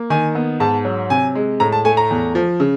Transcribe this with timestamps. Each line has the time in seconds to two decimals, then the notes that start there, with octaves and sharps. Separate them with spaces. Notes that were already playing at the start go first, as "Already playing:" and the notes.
Already playing: A#3
0.10 D#3 G#5
0.35 B3
0.60 G#2 A5
0.85 F#3
1.10 C3 G#5
1.35 G#3
1.60 A2 A#5
1.72 A5
1.85 A3 G#5
1.97 A#5
2.10 E2
2.35 F3
2.60 C#3